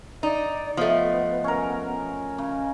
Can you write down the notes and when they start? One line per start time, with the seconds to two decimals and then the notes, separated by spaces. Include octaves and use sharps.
0.23 D#4 D5
0.77 F3 A3 B3 D#5
1.44 C#4 A#4
2.38 C#3